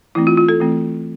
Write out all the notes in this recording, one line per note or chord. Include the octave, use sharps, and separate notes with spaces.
E3 A3 C4 E4
F4
F4
A4
E3 A3 C4